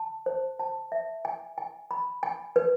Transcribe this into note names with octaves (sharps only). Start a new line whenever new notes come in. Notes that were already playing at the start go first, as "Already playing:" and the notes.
Already playing: A5
C5
A5
E5
G#5
G#5
B5
G#5
B4